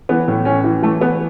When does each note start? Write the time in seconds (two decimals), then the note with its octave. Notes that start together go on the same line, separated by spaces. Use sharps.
0.09 E3 B3
0.28 A2
0.45 E3 C#4
0.64 E3
0.82 E3 A3
1.01 E3 B3